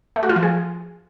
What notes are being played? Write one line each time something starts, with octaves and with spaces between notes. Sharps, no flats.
A3
F#4
F4
F3
G#4